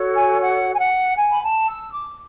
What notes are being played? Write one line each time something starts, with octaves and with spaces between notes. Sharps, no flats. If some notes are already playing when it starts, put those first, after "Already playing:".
Already playing: F#4 A4 C#5
G#5
F#5
G#5
F#5
G#5
B5
A5
E6
D6